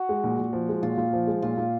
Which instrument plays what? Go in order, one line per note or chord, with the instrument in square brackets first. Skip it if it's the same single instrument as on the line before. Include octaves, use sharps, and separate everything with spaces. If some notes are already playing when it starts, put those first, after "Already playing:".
Already playing: [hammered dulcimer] F#4
[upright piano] G#3
A#2
A#2
F3
G#3
[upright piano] A#2 [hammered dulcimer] F4
[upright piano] A#2
F3
G#3
[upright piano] A#2 [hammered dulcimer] F4
[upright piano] A#2